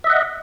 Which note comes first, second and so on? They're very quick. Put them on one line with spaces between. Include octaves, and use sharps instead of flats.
E5 D#5 F#5